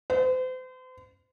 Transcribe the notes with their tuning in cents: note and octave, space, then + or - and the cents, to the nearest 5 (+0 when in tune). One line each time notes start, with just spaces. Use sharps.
C5 -40